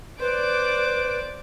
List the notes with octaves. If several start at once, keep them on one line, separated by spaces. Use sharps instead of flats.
B4 C5 D5 D6